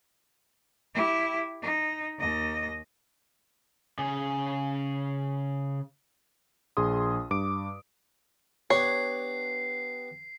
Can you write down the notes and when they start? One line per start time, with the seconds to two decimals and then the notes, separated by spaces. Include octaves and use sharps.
0.94 E4 G4
1.62 D#4
2.19 D#2 D#5
3.99 C#3 G#4
6.77 A#1 G#4 C6 D#6
7.31 G2 D6 D7
8.70 B3 D4 G4 C#5 C7